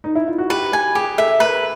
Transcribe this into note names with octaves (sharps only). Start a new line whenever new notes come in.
D#4
E4
F4
F#4
G4 B4
G4 G#5
G4 G#4
A4 E5
A#4 B4